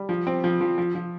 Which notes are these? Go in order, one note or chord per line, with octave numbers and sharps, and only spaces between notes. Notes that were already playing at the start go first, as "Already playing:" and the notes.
Already playing: G3
F3
C4
F3
F3
F3
F3